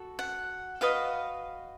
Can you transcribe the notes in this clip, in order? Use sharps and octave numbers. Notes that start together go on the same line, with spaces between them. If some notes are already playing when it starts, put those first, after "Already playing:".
Already playing: F#4 A4
F#5
F#4 B4 D#5 F5